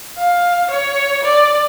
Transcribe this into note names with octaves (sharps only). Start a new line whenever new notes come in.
F5
C#5
D5